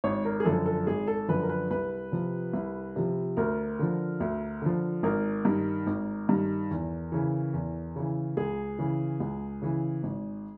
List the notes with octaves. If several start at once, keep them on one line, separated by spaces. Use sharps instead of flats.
G#1 C#5
A#4
G#4
F#2 D3 F3 A4
A4
G#1 G#4
A4
F#2 D3 F3 B4
A#4
B4
C2 B4
C3 F3
C2
C3 F3
D2 A#4
D3 F3
D2
D3 F3
G#1 A#4
G2 D#3
G#1
G2 D#3
E2
C#3 E3
E2
C#3 E3
C#2 G#4
C#3 E3
C#2
C#3 E3
G#1